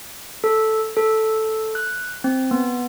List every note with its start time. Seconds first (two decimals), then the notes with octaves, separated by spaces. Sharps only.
0.44 A4
0.97 A4
1.75 F#6
2.24 C4
2.51 B3